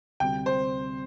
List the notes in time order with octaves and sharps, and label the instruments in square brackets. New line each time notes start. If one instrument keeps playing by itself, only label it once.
[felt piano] D2 C3 G3 C4 [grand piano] G5
[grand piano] C5